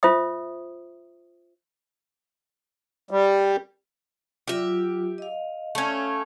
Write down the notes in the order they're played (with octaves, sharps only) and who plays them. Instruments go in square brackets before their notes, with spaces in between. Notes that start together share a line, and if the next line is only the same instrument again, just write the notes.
[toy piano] F4 C5 E5 D#6
[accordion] G3
[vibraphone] F#3 F4 [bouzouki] G4 E5
[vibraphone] D#5 F5
[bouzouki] A3 C#4 [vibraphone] F5